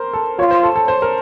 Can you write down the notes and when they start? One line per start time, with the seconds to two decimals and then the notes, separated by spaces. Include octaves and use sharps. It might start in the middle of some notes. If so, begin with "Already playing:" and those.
Already playing: A#4 C5
0.13 A4
0.39 F4 C#5
0.51 C5
0.63 A4
0.76 A4
0.88 C5
1.02 A#4